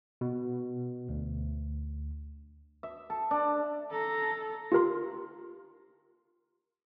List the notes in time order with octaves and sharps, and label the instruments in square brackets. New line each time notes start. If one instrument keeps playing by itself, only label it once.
[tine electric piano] B2
D2
[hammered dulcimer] E5
A4
D4
[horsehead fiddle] A4 [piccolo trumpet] A#5
[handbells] F4 G4 A#4 C6